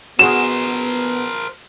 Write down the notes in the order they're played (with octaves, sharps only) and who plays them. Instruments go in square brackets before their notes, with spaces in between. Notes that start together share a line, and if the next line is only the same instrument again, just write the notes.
[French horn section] B3 [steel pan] F#4 G#4 [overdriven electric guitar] A#4 C5 [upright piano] E7